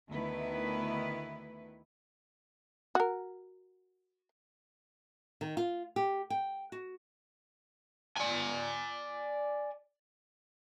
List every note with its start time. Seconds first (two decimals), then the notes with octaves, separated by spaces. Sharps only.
0.10 D2 D#3 B3 E4 B4
2.95 F#4 A#4
5.41 D#3
5.57 F4
5.96 G4
6.30 G5
6.72 F#4
8.18 D5 G#5